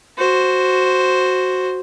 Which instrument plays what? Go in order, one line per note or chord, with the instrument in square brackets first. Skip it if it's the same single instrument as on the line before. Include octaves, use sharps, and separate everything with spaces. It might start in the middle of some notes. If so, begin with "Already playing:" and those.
[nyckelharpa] F#4 C5